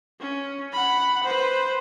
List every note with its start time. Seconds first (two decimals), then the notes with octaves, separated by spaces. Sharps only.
0.20 C#4
0.73 F#5 B5
1.23 B4 C5